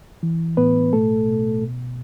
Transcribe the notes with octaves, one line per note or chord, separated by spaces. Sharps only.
E3
A2 B3 B4
B2 A3 A4
B2
B2